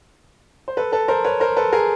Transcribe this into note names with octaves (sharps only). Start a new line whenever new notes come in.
C5
A4 B4
A4 B4
A#4 C5
B4 C#5
A#4 C5
A4 B4
G#4 A#4